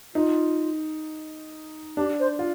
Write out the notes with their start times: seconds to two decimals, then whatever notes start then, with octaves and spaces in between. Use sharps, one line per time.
0.14 D#4 F4
1.97 D4 G4
2.20 C5
2.39 F4